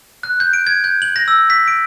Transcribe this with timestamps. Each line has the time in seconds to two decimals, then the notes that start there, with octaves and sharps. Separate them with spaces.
0.23 F#6
0.40 G6
0.53 D7
0.67 G#6
0.84 G6
1.02 F#7
1.16 A#6
1.28 E6
1.50 B6
1.68 D7